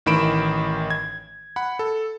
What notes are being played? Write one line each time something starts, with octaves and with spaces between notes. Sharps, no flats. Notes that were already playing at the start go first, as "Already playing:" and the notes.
A1 D#3 E3 B5 D7 E7
G#6
F#5 B5
A4